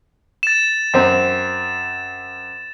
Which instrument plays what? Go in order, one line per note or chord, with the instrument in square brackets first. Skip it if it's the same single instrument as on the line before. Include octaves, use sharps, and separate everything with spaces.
[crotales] A6 E7
[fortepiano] F#2 C4